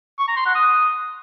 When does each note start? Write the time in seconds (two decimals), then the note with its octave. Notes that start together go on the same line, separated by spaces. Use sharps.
0.19 C#6
0.28 A#5
0.37 C6
0.46 F#5
0.55 D#6